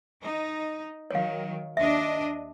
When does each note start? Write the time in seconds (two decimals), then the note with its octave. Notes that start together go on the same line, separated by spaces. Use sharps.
0.23 D#4
1.11 D#3 F#3 C#5 F5
1.77 D#2 D4 D#5 E5